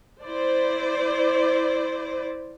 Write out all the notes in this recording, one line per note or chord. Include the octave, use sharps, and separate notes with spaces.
E4 C5 D5